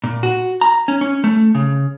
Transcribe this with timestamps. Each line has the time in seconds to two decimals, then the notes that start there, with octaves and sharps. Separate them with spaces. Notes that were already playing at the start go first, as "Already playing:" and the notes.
0.04 A#2
0.23 F#4
0.61 A#5
0.88 C#4
1.01 C#4
1.24 A3
1.55 C#3